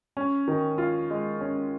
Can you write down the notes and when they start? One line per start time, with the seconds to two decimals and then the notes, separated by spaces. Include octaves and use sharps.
0.17 C#4
0.48 D#3
0.78 F4
1.10 G#3
1.41 C#4